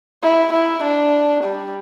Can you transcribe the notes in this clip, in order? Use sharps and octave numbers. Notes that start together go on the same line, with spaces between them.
E4
E4
D4
G3